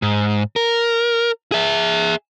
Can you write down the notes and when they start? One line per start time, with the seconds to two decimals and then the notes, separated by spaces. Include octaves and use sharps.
0.02 G#2
0.56 A#4
1.52 G#4 E5